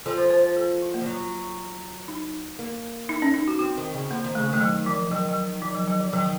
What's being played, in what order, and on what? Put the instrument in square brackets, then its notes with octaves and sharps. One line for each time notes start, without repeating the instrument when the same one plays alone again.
[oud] F3 [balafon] A4
[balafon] C5
C5
C5
A4
F4
A#3
[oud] F3
F#3
[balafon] D#4
[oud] A#3
[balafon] D#4
C#4
D#4
F#4
[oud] C4 [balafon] F#4
[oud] D#3
C#3
[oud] F3 [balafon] A#3
[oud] D#3
[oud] C#3 [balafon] A3
[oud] D#3 [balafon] A3
[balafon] F#3
F3
[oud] D#3 [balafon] F#3
[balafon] F#3
F3
F#3
F#3
F3
[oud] D#3 [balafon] F#3